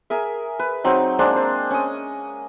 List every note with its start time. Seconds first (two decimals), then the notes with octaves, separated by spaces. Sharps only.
0.10 G#4 A#4 E5
0.59 B4
0.84 F#3 C4 D#4
1.19 G#3 A#3 C4 D4
1.36 C5
1.71 C#4 D#5